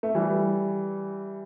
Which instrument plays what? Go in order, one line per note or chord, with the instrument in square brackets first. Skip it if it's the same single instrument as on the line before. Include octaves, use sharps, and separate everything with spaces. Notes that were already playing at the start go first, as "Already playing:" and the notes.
[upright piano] A3
E3 G3